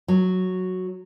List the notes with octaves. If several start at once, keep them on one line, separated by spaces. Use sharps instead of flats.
F#3